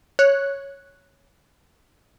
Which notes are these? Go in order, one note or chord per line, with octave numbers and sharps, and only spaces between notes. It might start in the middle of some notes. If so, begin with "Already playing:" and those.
C#5 F#6